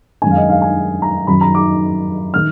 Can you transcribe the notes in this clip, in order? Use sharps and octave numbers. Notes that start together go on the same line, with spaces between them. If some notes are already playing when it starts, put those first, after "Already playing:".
F#2 D#3 G#3 G#5
F5
D#5
F5
G#5
A#5
F#2 D#3 F#3 B5
A#5
D6
D#3 F6